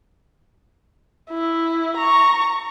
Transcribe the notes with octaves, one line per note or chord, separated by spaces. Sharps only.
E4
A#5 C#6